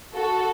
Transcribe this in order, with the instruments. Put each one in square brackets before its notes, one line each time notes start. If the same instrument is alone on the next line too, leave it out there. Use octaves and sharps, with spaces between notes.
[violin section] F#4 A4